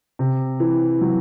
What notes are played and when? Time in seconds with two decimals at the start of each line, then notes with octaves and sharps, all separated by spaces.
0.19 C3
0.60 E3
1.01 F#3